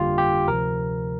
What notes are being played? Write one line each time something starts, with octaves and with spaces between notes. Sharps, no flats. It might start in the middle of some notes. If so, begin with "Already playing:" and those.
Already playing: G1 F2 D3 G3 A#3 F4 G4
G4
D2 C3 F3 A#4